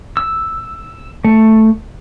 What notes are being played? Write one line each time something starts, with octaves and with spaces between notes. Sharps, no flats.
E6
A3